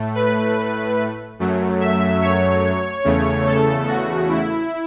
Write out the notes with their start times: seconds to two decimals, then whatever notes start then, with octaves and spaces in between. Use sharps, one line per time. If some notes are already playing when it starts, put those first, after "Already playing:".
Already playing: A2 A3
0.15 B4
1.39 F#2 F#3 A3
1.81 E5
2.22 C#5
3.04 E2 C#3 A3
3.47 A4
3.87 F#4
4.29 E4